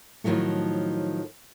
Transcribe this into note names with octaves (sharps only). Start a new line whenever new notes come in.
A2 D#3 F3 F#3 A3